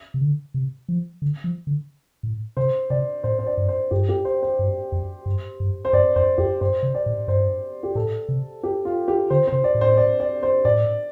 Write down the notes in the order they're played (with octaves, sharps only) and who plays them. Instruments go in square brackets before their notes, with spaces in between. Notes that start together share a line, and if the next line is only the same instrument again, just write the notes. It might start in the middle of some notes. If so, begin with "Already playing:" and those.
[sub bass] C3
D3
C3
F3
D3
F3
D3
A2
[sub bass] C3 [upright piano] C5
[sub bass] C3 [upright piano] D5
[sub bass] A2 [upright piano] C5
[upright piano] C5
D5
[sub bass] G2
[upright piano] C5
[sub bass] G2 [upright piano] G4
[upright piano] G4
C5
C5
[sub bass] G2
F2
G2
G2
[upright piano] C5
[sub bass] G2 [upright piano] D5
[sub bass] F2 [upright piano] C5
[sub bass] F2 [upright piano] G4
[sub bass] G2 [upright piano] C5
[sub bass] C3
[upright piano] D5
[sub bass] A2
[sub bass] G2 [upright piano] C5
[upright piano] G4
[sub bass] A2 [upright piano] A4
[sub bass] C3
[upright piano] G4
F4
G4
[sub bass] D3 [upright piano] C5
[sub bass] C3 [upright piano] C5
[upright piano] D5
[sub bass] A2
[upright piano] C5
D5
D5
C5
[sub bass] A2 [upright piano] D5